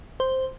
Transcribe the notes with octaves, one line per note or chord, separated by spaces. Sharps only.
C5